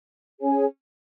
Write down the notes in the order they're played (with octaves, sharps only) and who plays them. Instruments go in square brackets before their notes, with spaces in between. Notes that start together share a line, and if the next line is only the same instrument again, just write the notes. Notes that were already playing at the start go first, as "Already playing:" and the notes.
[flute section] C#4 G#4 C#5 G#5